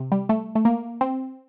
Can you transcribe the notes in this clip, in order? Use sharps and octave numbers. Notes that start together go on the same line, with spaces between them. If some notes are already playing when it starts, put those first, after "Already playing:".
Already playing: C3
G3
A3
A3
A#3
C4